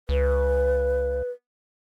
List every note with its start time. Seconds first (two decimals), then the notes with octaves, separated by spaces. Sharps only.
0.09 C#2 B4